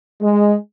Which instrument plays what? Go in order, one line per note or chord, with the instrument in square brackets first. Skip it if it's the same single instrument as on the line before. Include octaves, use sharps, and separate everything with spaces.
[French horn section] G#3